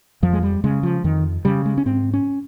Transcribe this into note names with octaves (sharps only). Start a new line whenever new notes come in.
F2 F3
G#3
G3
C#3 G#3
F3
F2 D#3
C#3 G3
G#3
C#4
G#2 C4
C#4